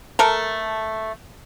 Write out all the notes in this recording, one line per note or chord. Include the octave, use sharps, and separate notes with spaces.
A3 A4 A#4